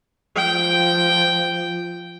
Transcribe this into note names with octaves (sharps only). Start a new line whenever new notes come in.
F3 G5